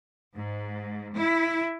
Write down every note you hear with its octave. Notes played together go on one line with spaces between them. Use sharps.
G#2
E4